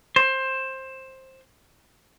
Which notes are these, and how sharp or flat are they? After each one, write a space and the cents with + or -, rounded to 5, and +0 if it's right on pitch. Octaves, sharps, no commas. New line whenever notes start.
C5 +15